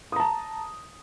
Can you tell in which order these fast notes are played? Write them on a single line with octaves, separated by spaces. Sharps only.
D#6 A#5 A5